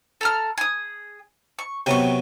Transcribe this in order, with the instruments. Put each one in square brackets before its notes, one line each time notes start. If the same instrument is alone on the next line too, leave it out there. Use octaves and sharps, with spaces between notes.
[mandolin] A4 A#5 F6
G#4 D#6
C#6
[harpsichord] C3 F#3 B3 [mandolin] G5 C#6